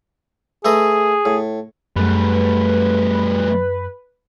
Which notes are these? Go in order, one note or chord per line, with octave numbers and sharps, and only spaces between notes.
A3 G#4 B4 D#5
A2
F#2 G3 A3 B4